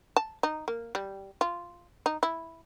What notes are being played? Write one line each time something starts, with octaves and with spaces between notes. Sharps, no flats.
A5
D#4
A#3
G3
F4
D#4
E4